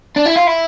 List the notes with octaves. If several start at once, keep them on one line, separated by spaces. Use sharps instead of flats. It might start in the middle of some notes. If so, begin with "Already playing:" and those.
D4
E4
F4
E4